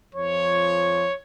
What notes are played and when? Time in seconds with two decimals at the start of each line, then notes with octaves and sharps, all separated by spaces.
0.14 F2 F3 C#5